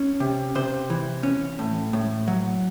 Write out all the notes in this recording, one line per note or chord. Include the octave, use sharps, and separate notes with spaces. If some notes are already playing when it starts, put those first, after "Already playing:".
Already playing: C#4
C3
C3 C5
E3
C#4
A2
A2
F#3